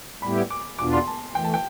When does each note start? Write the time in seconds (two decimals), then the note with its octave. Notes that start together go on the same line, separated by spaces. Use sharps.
0.22 A2 G3 B3 E4 G4 B5
0.50 D6
0.79 E2 B2 B3 D4 F4 D6
0.93 C6
1.07 A5
1.35 E3 A3 G5
1.45 A5
1.54 G5